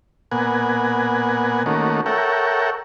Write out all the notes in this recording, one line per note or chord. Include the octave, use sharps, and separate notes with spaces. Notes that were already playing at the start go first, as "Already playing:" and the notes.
A#2 B3 F#5 G#5
D#3 A3 A#3 C#4 F#4
A4 A#4 C#5 E5 F#5 G5